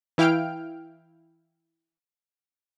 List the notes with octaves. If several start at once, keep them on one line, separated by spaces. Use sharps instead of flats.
E3 E4 F5 G5 F6 D7